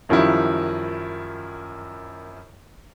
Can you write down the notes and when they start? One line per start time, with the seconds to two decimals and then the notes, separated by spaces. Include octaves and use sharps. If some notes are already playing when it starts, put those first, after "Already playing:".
0.09 F#2 D#3 F3 G3 E4